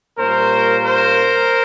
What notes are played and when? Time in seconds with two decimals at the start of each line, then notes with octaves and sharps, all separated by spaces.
0.18 A#2 G3 A#3 C#4 A#4 C5
0.84 A#4 C5